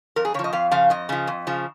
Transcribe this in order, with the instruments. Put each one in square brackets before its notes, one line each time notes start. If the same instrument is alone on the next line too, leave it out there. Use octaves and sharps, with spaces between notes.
[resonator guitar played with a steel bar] F2 A#4
G#4
C#3 C#5
F3
D#5
F2 F5
C#3 F3 F5
F2 D#5
C#3 F3
F2
C#3 F3